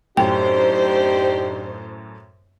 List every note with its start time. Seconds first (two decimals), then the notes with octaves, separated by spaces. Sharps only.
0.17 F#2 A2 D4 D#4 G4 C5 G5